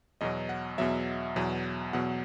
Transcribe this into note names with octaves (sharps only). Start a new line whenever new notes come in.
E2 B2 F#3 D#5
F#5
E2 B2 F#3 E5
E2 B2 F#3
E2 B2 F#3 F#5